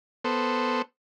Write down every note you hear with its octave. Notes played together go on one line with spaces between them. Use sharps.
B3 A4 C5